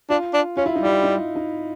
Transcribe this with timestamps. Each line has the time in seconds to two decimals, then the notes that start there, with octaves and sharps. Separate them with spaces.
0.10 D4 F4
0.33 D4
0.57 C#4 F4
0.66 E4
0.76 D#4
0.81 G3 E4
1.03 D#4
1.36 D#4